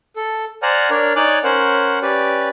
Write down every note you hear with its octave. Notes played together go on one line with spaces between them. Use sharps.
A4
C5 D5 F#5 G#5 A#5 F6
D4 A#4 C#5 D5
D#4 C#5 D5 G#5 D6 F#6
C#4 A#4 C5 F#5
C#4 G4 B4 D5